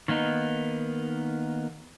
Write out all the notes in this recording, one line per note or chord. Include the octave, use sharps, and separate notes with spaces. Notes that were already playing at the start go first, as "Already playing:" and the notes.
D#3 A#3 B3 D#4